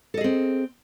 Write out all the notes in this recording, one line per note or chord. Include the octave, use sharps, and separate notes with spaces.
C4 G#4 A4 D#5